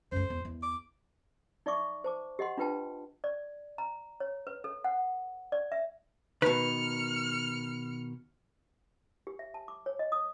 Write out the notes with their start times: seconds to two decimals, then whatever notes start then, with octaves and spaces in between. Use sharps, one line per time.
0.12 F#2 A3 C5
0.30 E2
0.45 E2
0.63 D6
1.66 D#4 D5 E5 C#6 D6
2.04 C5 A5 D6
2.39 G4 D#5 F#5 C6
2.57 D4 F4 B4 G5 A5
3.24 D5
3.78 A#5
4.20 C#5
4.47 B4
4.64 A4
4.84 F#5
5.52 D5
5.72 E5
6.42 B2 D#3 B4 F6 C#7
9.27 G4
9.39 E5
9.54 A5
9.68 D6
9.86 C#5
9.99 D#5
10.12 D#6